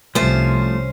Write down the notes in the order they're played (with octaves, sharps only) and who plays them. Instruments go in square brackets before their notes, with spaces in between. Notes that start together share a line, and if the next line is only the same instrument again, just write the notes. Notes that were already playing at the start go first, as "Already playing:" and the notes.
[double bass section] C2 [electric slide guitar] F3 A3 F4 [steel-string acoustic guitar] C#4 C5